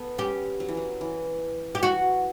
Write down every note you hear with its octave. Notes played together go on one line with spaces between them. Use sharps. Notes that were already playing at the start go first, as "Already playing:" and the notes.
Already playing: B3 A4 B4
C#4 G4
F#3
E3
F#3
E3
G4
E3 F#3 F#4